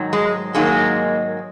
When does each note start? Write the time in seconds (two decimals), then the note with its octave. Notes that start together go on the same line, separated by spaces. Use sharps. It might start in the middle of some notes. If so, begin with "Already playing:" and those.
Already playing: G#2 D#3 F#3
0.13 G#3
0.54 G#2 D#3 F#3 G#3 A#3